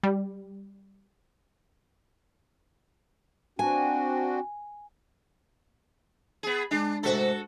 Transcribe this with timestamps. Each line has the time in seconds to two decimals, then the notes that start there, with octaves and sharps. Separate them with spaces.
0.03 G3
3.59 C4 D4 F#4 G#5
6.43 B3 G#4
6.71 G#3 D4
7.03 G#2 C3 A3 F#4 A4